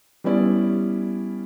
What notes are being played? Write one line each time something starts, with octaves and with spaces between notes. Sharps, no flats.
G3 B3 C#4 E4 D5